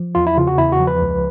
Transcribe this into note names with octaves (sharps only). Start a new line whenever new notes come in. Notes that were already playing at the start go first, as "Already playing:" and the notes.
Already playing: F3
E2 F4
E4
C#3 F4
F#4
E2 E4
F#4
F3
B4
C#2